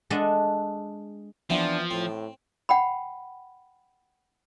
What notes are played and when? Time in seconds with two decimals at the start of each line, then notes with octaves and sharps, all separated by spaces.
0.10 G#3 D4 A4 D#5 E5 F#5
1.50 E3 F3 B3 C4 D4
1.91 A2 C4
2.69 F#5 G5 B5